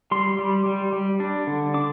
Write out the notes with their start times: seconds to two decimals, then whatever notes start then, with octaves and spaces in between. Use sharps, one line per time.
0.11 G3 C6
0.39 G3
0.66 G3
0.93 G3
1.20 D4
1.47 D3
1.74 D4 D6